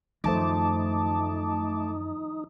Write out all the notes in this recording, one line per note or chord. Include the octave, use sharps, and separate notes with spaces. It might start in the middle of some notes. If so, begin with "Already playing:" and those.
F#2 D#3 F3 A3 D#4 C5 A5 D6